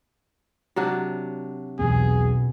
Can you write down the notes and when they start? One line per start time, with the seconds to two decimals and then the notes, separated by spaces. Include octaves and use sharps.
0.76 C3 F#3 D4
1.79 B1 E2 B2 B3 G#4